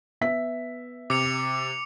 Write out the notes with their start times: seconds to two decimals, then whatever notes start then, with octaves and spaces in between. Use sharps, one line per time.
0.21 B3 E5 B6
1.10 C3 D6 C#7 F7